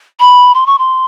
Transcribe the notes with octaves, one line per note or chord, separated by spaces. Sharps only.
B5
C6
C#6
C6